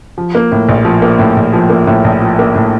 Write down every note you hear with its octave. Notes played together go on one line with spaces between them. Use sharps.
F3
A#3
A2
A#1
F3
A#3
A2
A#1
F3
A#3
A2
A#1
F3
A#3
A2